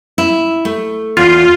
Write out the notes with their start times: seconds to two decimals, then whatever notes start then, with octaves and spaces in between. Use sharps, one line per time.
0.18 E4
0.65 A3
1.17 E2 F4